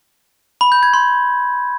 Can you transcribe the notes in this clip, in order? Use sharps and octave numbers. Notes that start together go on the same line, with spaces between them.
B5
G6
G#6
C6